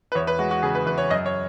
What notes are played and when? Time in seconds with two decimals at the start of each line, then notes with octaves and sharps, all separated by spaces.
0.12 B4
0.15 E2 C#5
0.27 B4
0.39 G#3 F#4
0.51 F#4
0.63 C#3 G#4
0.75 B4
0.86 E2 B4
0.98 C#5
1.10 F#2 D#5
1.26 C#5